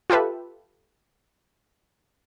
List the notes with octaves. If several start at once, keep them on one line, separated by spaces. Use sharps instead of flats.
F4 G4 A4 B4 E5